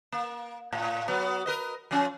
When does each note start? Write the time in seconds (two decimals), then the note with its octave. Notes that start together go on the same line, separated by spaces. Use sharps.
0.12 A#3
0.73 A2
1.08 F#3 B3
1.46 A#4 B4 D#5
1.91 F3 C#4